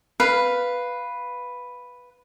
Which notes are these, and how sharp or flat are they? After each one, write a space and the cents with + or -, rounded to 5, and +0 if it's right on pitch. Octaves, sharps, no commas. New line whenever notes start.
B4 +0 F5 +0